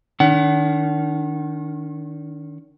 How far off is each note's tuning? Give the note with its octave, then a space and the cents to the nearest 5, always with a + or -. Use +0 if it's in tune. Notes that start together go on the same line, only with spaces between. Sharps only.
D#3 -5 D4 -45 F#5 +30